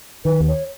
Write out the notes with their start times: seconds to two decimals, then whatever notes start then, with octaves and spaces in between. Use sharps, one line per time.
0.25 D#3 B4
0.40 D#2
0.48 C#5